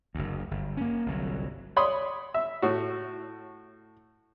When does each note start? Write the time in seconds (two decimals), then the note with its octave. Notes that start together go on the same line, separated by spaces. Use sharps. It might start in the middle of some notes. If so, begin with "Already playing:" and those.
0.15 F#1 D2
0.51 G1
0.77 A#3 C#4
1.06 G1 C2 F#3
1.76 C#5 D5 B5 C6 D#6
2.34 E5 E6
2.62 A2 F#4